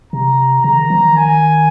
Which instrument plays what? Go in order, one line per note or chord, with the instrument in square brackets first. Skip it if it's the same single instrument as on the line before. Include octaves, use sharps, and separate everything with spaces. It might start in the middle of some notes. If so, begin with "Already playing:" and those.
[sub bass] C3 [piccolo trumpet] A#5
[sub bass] C#3 [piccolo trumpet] A#5
[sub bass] D#3
F3
D#3
[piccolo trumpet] G#5